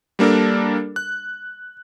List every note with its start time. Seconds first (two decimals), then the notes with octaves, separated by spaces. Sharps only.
0.19 G3 A#3 D4 A4 A#4
0.96 F#6